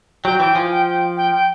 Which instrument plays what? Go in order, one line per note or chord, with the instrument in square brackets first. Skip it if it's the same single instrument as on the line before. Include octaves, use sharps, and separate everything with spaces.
[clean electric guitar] F#3 [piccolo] G5
[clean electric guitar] E3 [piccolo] G5
[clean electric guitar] F3 [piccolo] G#5
[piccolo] G5
G5
G5
G5